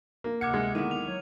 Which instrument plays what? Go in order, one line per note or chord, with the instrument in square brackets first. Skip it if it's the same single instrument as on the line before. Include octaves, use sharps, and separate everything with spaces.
[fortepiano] A#3
[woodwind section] D2 C3 F#5 [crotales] D6 F6 [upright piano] G#6 C#7
[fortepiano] G#3
[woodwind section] D3 A#3 B3 [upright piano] D#3 E4 [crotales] D#7
[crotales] F7
[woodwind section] F#3 C#5